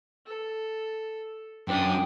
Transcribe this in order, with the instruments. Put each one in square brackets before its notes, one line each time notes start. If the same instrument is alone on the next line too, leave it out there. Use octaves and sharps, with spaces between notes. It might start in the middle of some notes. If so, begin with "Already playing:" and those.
[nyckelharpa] A4
[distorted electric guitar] F#2 [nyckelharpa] D4 D#6 [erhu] G5